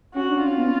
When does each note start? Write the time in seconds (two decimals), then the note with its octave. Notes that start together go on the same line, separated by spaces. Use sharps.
0.14 C#4 F#4
0.29 D4
0.43 C#4 F4
0.57 B3